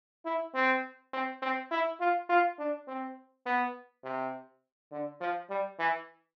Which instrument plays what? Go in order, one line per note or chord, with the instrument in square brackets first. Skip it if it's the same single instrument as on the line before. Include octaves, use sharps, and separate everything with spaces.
[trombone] E4
C4
C4
C4
E4
F4
F4
D4
C4
B3
C3
D3
F3
G3
E3